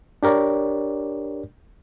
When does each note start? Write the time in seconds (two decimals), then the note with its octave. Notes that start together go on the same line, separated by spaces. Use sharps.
0.23 D4 G4 A#4 C#5 D5